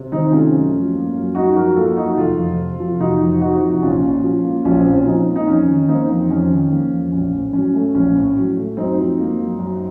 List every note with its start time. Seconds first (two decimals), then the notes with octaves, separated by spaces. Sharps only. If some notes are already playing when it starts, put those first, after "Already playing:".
Already playing: C3
0.12 D#3 C4 D#4
0.32 A3 C#4 F4
0.53 F#2
0.74 F3
0.94 A#3
1.14 F#2
1.35 F#2 D#4 F#4
1.56 F3 F#4 A#4
1.76 A#3 F4 A4
1.97 F#2 D#4 F#4
2.07 F#4
2.17 F1 F4 A4
2.39 F2
2.59 C3
2.80 F3
3.00 F1 D#4 F#4
3.21 F2
3.41 C3 D#4 F#4
3.62 F3
3.82 A#1 C#4 F4
4.03 A#2
4.24 F3
4.45 A#3
4.65 A#1 C#4 F4
4.79 C4
4.86 A#2
4.92 C#4
5.06 F3 C4 D#4
5.28 A#3
5.36 D#4
5.47 F2 C#4
5.68 D#3
5.88 A#3 C4 D#4
6.10 F2
6.30 F2 C#4
6.50 D#3
6.72 A#3
6.91 F2
7.12 A#1 C#4
7.33 A2
7.53 F#3 C#4
7.74 A3
7.95 A#1 C#4
8.16 A2
8.36 F#3
8.57 A3
8.77 F#2 C4 D#4
8.98 F3
9.19 A#3
9.39 F#2
9.59 F#2